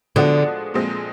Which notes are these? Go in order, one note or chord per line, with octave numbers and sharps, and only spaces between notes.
D3 F3 G#3 B3 D4 F#4
A#2 F3 G#3 C4